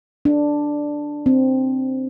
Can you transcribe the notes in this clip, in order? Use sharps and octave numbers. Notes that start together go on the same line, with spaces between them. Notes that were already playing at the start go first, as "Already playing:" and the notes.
D4
C4